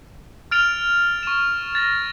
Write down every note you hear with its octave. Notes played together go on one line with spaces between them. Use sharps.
F6 A6 D7 F7
C#6 E7
A6 A#6